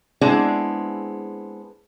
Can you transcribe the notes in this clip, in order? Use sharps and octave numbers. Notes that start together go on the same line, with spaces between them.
G#3 B3 C4 D4 E4 G#4